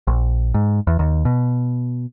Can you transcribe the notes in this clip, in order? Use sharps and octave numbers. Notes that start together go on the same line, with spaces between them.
A#1
G#2
E2
D#2
B2